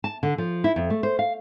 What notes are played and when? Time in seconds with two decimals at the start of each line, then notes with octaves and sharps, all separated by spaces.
0.04 A5
0.23 D3
0.38 F3
0.64 E4
0.76 F2
0.90 A3
1.03 C5
1.19 F5